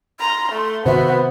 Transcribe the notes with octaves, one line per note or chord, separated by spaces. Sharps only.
A#5 C6
A3
C3 D#3 B3 C4 F#4 C5 E5